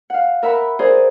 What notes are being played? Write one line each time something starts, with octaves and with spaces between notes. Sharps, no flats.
F5 F#5
A#4 E5 F#5 B5
G#4 A#4 C5 D5